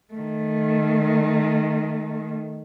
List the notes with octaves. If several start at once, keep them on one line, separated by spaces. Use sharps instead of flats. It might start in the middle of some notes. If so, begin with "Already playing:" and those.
D#3 A3